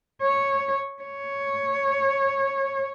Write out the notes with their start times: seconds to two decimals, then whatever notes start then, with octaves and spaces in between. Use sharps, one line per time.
0.22 C#5
1.02 C#5